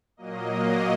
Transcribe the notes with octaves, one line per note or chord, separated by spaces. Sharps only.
A#2 F#3 A#3 D#5